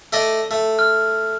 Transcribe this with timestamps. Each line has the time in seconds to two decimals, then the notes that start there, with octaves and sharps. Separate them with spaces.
0.13 A3 D5 D#5
0.51 A3
0.79 F6